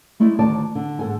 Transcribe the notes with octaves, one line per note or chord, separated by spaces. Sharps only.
G#3 A3 E4 D5
D2 D#3 F4 D5 A5
D3
G#2 D3 A4 F#5 G#5